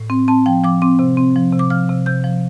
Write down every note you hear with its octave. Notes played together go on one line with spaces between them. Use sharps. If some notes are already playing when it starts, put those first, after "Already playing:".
Already playing: A2
C4
C4 A5
F3 G5
F3 D6
C4 D6
C3
C4
F3
C3
D6
F3 F6
C3
C3 G6
F3